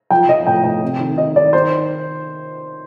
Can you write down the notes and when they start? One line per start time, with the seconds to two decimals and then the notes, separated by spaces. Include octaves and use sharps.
0.10 F3 G5
0.29 F3 D#5
0.47 A2 G5
0.64 A2 G5
0.82 C3
1.00 D#3
1.17 D#3 D#5
1.36 D#3 D5
1.53 D#3 C5